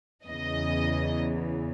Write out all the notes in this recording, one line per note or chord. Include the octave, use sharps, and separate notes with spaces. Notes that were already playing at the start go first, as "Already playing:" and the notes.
E2 C#3 E3 D#5